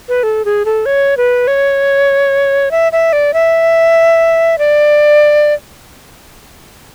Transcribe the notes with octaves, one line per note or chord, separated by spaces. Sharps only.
B4
A4
G#4
A4
C#5
B4
C#5
E5
E5
D5
E5
D5